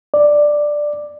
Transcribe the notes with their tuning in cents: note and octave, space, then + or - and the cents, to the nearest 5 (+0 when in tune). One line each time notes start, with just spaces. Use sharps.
D5 +5